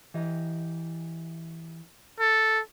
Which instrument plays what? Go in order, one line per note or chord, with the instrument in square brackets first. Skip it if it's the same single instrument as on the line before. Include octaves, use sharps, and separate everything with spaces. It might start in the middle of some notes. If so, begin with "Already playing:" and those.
[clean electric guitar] E3 G4 D#5
[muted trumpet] A4